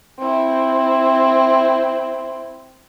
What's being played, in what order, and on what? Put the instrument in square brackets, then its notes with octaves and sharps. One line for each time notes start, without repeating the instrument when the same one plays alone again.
[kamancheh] C4 E4